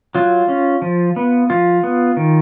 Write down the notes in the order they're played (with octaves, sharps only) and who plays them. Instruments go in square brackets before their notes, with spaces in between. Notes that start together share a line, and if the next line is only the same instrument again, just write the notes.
[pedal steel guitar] F#3 F4
C#4
F3
B3
F3 F4
B3
D#3